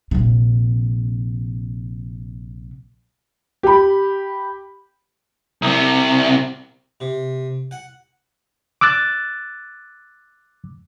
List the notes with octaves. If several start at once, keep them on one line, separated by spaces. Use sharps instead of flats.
A#1 C3
G4 B5
C2 C3
C3
F#5
D6 E6 F#6 A6